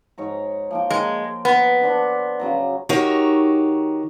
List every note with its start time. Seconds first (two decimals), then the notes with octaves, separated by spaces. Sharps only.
0.18 G#2 C#5 A#5
0.71 F3 A#3 G5
0.91 G#3 A#4 G5
1.45 B3
1.81 D3 D4 C5
2.40 C#3 F#3 A#5
2.89 D#3 D#4 F#4 G4 A#4 C#5